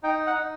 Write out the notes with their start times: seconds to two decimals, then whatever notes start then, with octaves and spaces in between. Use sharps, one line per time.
0.03 D#4 G5
0.27 F#5
0.35 D#4